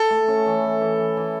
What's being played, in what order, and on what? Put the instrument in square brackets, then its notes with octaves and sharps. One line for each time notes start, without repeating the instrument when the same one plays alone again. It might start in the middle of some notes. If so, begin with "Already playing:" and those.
Already playing: [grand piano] A4
[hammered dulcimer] A3
C#4
E3
E3
E3
E3
E3